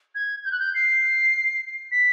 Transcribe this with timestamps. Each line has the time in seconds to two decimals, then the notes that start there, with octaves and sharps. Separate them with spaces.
0.15 G#6
0.45 G6
0.52 F#6
0.60 G6
0.74 C7
1.92 B6